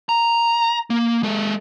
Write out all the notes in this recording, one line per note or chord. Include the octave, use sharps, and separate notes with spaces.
A#5
A#3
G#3 A4